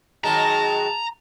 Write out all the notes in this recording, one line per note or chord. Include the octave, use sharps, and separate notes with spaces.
D#3 F#3 G#3 A5 A#5